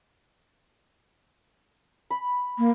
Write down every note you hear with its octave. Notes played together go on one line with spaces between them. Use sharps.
B5
A#3